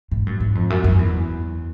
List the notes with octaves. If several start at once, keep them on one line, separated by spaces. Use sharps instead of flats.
G#2
F#2
G#2
F2
F#2
F#2
E2